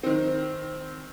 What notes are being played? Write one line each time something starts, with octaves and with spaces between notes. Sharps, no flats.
D#3 C4